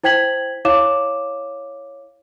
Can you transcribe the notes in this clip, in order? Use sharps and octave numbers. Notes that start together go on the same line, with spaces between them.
E4 C5 G5 G#6 B6 F#7
E4 C#5 F5 D6 E7